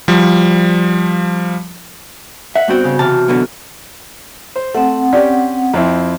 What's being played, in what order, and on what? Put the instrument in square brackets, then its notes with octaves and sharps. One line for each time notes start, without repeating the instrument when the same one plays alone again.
[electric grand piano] F3 G3
[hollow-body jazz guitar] E5 [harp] F#5
[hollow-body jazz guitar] G2 C4 [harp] B3 F#4 G5
[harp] C#3
[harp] C3 E3 F6 [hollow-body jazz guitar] A5
[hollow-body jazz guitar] F#2 B2 D3
[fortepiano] C5
[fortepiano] A3 [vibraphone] C4 F#5
[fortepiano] C#4 G4 [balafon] D5
[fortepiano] F2 C4 E4